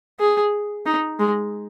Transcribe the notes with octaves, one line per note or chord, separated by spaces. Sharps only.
G#4
D#4
G#3